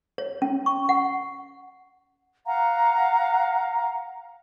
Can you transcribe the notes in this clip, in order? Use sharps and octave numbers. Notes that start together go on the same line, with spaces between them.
C#5
C#4
C#6
F#5
F5 F#5 A#5